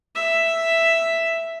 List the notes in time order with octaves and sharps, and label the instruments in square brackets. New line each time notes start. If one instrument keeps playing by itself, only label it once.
[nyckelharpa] E5